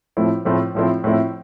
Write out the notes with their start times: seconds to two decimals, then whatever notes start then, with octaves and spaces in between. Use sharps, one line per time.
0.17 A2 F3 A3 C4 E4
0.45 A2 F3 A3 C4 E4
0.75 A2 F3 A3 C4 E4
1.04 A2 F3 A3 C4 E4